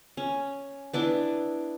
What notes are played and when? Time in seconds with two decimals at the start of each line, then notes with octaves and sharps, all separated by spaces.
0.17 C#4
0.93 B3 D4 E4 D6